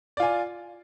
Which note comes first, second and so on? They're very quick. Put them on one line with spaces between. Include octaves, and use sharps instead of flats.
D5 F4 G#5